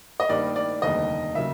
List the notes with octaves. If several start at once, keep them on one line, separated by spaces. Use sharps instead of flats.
D#5
G2 D#3 G3 A#3 D5
D5
F1 D#2 D3 G3 D#5
C#3 F#3 A#3 E5